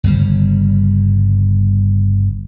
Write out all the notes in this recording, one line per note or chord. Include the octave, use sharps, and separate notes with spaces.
G1 C#3 G3